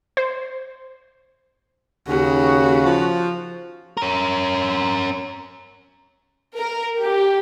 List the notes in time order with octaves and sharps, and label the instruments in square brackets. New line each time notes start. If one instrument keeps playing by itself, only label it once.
[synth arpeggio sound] C5
[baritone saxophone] D#2 [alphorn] C#3 [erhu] F#4
[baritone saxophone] F3
[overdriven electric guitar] C#4 A#4
[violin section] A#4
G4